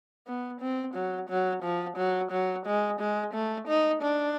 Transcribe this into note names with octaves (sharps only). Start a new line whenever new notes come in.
B3
C4
F#3
F#3
F3
F#3
F#3
G#3
G#3
A3
D#4
D4